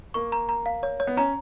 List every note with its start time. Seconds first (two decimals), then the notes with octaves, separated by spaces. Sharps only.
0.14 A#3 C#6
0.32 A#5
0.49 A#5
0.66 F5
0.83 C#5
1.00 C#5
1.07 B3
1.17 C#4 A#5